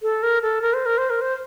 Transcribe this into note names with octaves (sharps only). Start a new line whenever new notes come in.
A4
A#4
A4
A#4
C5
A#4
C5
A#4
C5